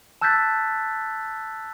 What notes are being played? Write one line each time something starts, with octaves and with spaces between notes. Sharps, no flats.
A5 E6 F#6 G6 A6 B6